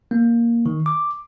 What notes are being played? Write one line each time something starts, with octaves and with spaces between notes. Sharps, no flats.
A#3
D#3
D6